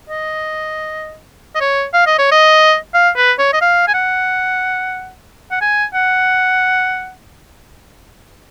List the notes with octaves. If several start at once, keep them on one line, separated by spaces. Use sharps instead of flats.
D#5
D#5
C#5
F5
D#5
C#5
D#5
F5
B4
C#5
D#5
F5
G#5
F#5
F#5
G#5
F#5